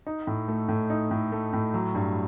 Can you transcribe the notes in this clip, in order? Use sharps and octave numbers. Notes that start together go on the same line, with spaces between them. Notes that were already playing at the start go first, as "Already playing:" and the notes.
D#4
A2
A3
A2
D#4
A2
A3
A2
F#3
G2